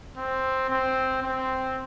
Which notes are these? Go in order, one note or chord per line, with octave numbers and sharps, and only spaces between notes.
C4
C4
C4